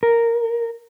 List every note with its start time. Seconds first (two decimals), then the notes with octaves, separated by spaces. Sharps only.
0.03 A#4